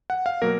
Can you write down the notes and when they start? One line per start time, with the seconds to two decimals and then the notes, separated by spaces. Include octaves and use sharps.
0.10 F#5
0.26 F5
0.42 B2 F#3 A#3 A#4